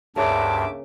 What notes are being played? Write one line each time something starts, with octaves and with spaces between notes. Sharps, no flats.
D2 G2 C#3 A#3 E5 A5 D6